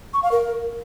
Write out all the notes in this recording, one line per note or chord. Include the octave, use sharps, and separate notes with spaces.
C#6
F5
A#4